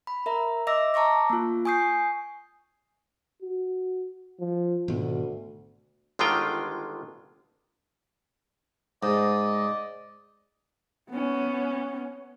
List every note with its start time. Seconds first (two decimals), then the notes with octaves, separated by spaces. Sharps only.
0.07 B5
0.26 A#4 E5 A#5
0.67 D#5 E5 D6 E6 A#6
0.94 A5 A#5 C#6 D6 A#6
1.30 A#3 F4
1.65 G#5 C#6 D#6 G6 C7
3.42 F#4
4.39 F3
4.88 G#1 D2 B2
6.19 G1 D3 D#3 G#3 F4 G5
9.03 G#2 D5 D#5
11.11 B3 C#4